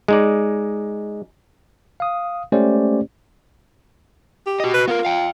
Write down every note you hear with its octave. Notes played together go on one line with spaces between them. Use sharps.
G#3 D#4 D5
F5 D#6
G#3 A3 C#4 G4 C5 D5
G4
F#4 D#5
B4
B3 F4 A#4
F5 G5